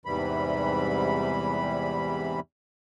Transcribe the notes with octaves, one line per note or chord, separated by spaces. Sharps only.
E2 G#2 C3 E3 G3 B5